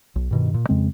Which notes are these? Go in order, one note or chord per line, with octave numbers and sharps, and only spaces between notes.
B1
G2 B2 D#3
A#2
F2 C#3 G#3 C4